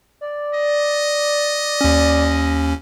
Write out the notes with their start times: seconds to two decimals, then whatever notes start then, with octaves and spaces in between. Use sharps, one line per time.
0.21 D5
0.54 D#5
1.81 D#2 C#4